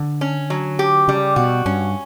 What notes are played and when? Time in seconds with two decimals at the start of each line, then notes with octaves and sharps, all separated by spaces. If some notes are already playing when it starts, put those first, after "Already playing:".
Already playing: D3
0.21 C#4
0.50 F#3
0.79 G4
1.08 C#3 G3
1.36 B2 F#4
1.65 G2 C#4